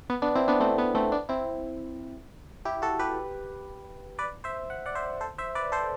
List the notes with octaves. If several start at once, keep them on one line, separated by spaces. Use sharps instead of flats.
B3
B3 D4
C4 E4
B3 D4
A3 C4
B3
A3 C4
B3 D4
C4 E4
E4 G4
F#4 A4
G4 B4
B4 D5
C5 E5
F#5
D5 F#5
C5 E5
A4 C5
C5 E5
B4 D5
A4 C5